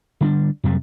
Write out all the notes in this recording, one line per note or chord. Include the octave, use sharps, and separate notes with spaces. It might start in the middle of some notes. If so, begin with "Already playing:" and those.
D3 G3 D4
F2 C3 F#3 G3